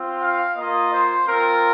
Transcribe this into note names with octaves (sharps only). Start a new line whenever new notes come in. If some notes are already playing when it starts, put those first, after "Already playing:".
Already playing: C4 F4
F5
A#3 F4 D#5
C5
C4 F4 A#4